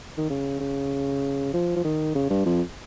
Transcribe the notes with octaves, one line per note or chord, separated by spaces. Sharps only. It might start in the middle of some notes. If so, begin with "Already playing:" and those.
D#3
C#3
C#3
F3
F3
D#3
C#3
G2
F2